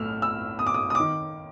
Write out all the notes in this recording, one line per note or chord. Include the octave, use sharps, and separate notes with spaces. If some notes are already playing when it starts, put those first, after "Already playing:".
Already playing: B1 A2 A3 E6 F6
E6
D#6
D6
D#6
D#6
D#3 D6